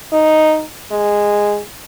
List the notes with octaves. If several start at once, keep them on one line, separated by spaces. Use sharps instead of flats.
D#4
G#3